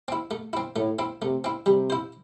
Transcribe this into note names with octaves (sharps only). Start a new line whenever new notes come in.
C4 E4
A3
C4 E4
A2 A3
C4 E4
C3 A3
C4 E4
C3 G3
E4 C5